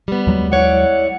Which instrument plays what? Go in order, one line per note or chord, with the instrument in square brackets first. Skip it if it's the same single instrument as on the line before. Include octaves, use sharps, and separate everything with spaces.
[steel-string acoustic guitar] G3 B3
[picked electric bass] D#2 F#3 G#3
[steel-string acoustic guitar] E4 C#5 D5 [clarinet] F#5